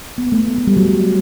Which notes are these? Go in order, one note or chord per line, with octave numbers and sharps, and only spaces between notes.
B3
A3
B3
A3
G3
F#3